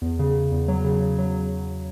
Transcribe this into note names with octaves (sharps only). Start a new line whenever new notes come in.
E2
C#3
C#3
E2
F#3
C#3
C#3
F#3